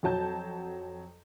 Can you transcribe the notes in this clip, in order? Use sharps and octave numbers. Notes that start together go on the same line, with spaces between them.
F2 F#3 A5 G6